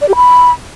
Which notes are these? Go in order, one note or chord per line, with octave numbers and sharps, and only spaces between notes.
D5
G4
B5